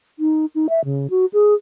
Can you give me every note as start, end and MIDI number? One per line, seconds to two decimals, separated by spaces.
0.19 0.45 63
0.55 0.67 63
0.69 0.84 76
0.84 1.07 49
1.10 1.25 66
1.33 1.54 68